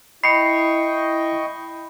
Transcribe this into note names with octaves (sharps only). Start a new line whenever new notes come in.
E4 D#5 G5 B5 C#6 C7 C#7